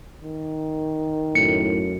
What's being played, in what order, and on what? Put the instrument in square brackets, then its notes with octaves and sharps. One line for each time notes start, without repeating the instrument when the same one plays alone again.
[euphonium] D#3
[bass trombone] F#2 [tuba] A2 [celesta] C#7